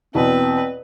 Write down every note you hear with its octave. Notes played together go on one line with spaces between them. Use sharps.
E2 B2 C4 B4